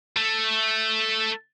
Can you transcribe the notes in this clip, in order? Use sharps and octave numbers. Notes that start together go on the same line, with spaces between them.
A3